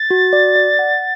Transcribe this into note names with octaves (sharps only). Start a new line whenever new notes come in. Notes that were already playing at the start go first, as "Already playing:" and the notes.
Already playing: A6
F#4
D5
D5
F#5